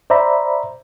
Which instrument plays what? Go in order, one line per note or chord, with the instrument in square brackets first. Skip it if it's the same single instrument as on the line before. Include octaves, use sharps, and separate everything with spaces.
[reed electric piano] C5 D5 E5 A#5 B5